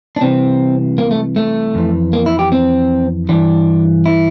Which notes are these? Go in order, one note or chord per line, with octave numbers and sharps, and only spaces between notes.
D4
C2 C3 E3 C4
A#3
A3
A3
F2 E3
A#3
E4
G4
C4
G2 E3 D4
E4